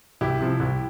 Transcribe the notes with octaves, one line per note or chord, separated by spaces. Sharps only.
C2 E4 G4
C3 F3
C2